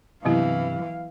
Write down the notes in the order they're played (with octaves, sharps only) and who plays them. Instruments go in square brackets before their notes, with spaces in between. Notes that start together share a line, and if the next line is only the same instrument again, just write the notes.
[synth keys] G2 C3 C4 [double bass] E3 [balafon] F#3 B3 E4 [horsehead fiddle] F5